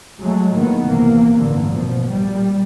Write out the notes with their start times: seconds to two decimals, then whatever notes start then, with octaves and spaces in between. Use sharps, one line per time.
0.21 F#3 G#3 A3
0.53 A2 D#3 A#3 B3
0.86 A#1 C3 E3 A#3
1.36 A1 G2 D3 A#3
1.73 B2 F3
2.10 A#2 G3